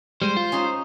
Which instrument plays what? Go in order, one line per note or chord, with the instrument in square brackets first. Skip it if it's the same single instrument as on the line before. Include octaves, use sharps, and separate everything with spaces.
[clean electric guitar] G3 G#3 [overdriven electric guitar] C5
[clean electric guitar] F4
[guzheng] C#4 D#4 G#4